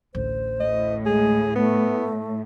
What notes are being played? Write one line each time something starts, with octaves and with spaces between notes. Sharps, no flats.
A1 D2 C5
A2 D#5
G#3 G#4
A3 B3